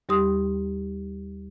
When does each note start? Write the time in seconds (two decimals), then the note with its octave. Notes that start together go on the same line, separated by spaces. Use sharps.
0.09 D#2 G3 G4 C6 D#6